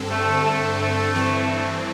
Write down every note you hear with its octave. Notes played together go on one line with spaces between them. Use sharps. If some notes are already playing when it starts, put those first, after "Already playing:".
Already playing: G2 D3 C4 A4
A3
A3
A3
G2 E3 C4